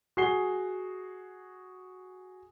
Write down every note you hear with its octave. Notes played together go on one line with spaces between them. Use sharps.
F#4 G#4 C7 G7